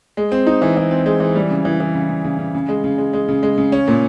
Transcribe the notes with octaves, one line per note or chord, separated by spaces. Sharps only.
G#3
C4
D#4
E3
E3
C4
G#3
E3
G3
C#3
E3
E3
C#3
C#3
C#3
C#3
C#3
G#3
C#3
G#3
G#3
C#3
G#3
C#3
C#4
A#2